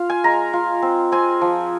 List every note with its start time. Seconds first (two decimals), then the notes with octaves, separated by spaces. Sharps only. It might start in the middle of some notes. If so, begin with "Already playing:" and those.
Already playing: F4 F5
0.10 G#5
0.24 G#3 A#5
0.53 F4
0.82 C4
1.12 C4 G#5
1.41 F3